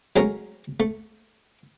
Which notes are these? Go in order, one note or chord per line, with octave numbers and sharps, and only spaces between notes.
F#3 G#3 A3 C#4 A#4
A3